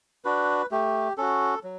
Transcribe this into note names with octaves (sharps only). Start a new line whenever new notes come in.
D4 F#4 B4
A3 G4
C#4 F#4 A4
F#3